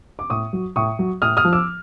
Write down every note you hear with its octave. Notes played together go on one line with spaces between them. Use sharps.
D6
A2 C#6 D#6
F#3
A2 C#6 D#6
F#3
A2 D#6 F6
D#6 F6
F3
D6 E6